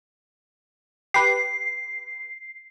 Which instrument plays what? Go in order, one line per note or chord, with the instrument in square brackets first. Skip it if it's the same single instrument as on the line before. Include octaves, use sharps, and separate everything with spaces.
[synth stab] G4 B4 [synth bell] C7